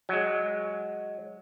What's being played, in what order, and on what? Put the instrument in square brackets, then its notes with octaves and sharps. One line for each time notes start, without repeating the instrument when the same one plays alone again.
[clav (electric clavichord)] F#3 G#3